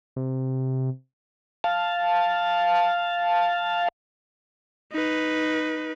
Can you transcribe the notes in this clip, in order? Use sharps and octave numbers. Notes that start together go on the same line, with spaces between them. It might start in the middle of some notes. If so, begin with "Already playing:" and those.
C3
F5 A5
D#4 B4